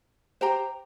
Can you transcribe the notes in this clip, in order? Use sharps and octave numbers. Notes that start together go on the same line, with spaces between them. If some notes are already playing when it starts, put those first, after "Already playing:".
G4 C5 G5 A#5